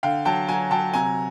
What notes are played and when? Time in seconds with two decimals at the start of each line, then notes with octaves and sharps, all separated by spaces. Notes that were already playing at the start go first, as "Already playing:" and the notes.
0.03 D3 F5 G5
0.25 F#3 G5 A5
0.48 F#3 G#5 A#5
0.71 F#3 G5 A5
0.94 C3 G#5 A#5